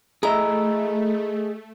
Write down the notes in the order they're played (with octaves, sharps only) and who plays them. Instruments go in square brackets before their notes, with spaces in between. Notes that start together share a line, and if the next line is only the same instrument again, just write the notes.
[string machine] A3 [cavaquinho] E4 A#5 [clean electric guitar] G#4 D#5 E5